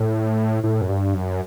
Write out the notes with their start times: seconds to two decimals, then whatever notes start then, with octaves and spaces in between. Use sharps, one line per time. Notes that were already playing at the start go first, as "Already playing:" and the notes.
Already playing: A2
0.64 A2
0.81 F#2
0.89 G2
1.14 F#2